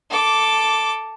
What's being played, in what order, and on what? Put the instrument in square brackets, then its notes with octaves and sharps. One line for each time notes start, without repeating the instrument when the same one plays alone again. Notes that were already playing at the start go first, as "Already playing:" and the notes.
[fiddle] A4 D6